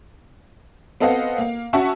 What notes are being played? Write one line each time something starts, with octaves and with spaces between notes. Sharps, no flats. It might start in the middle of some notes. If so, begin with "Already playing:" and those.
B3 C4 A4 D#5 F5 F#5
A#3 F5
C#4 F#4 E5 F#5 A5 C#6